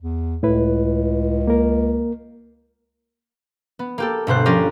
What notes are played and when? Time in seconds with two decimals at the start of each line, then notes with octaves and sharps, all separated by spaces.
0.01 E2
0.43 C#2 A2 E4 B4
1.47 A#3 A#4
3.79 B3
3.98 A#3 G4 A4
4.27 G1 B2 C5 F#6
4.46 F3 C#4 F4 G4 A#4 D5